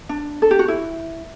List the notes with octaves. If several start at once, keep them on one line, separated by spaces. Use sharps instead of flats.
D4
A4
G4
F#4
E4